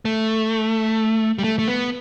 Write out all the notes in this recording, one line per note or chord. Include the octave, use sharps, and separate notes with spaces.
A3
G3
A3
A3
B3